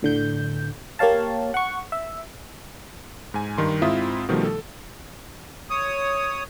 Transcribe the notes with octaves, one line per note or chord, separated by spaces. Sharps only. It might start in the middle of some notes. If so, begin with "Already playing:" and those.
A2 D3 G6
A#3 G4 C#5 F5 A5
F#5 C#6
E5
G#2 G#5
G2 D#3 C6
G#2 C4 E4 F4 E5 D#6
B2 D#3 F3 G3 A3
A4
C#5 D#6